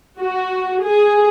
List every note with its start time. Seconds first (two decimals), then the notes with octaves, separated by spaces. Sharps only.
0.19 F#4
0.83 G#4